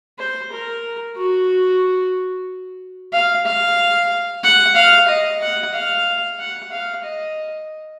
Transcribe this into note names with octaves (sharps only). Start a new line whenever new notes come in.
C5
A#4
F#4
F5
F5
F#5
F5
D#5
F#5
F5
F#5
F5
D#5